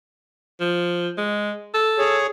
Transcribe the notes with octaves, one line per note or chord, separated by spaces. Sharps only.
F3
G#3
A4
G#4 C#5